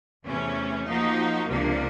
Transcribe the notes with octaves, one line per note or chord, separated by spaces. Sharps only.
E2 C3 E3 A3 C#4
F3 A#3 D#4 F#4
C#2 C3 F3 A#3 D4